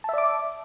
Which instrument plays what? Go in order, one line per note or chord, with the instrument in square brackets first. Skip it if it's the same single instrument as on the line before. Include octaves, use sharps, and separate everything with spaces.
[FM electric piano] A5
E5
D5
D6